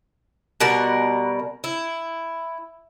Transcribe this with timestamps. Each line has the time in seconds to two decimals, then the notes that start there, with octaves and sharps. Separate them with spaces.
0.61 B2 G3 A#4 F#5
1.64 E4